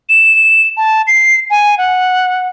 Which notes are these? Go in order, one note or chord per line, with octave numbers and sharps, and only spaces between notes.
E7
A5
C7
G#5
F#5